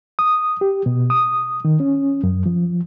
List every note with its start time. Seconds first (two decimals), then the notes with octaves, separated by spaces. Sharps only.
0.19 D#6
0.61 G4
0.86 B2
1.10 D#6
1.65 D#3
1.80 C#4
2.24 F#2
2.46 F3